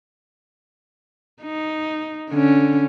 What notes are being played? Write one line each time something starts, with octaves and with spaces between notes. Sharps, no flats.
D#4
D3 C#4